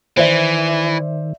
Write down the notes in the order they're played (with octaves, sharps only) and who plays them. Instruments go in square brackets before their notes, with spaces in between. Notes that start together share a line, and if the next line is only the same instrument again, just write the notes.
[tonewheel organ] D#3 [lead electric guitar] E3 [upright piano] C5 D5 E5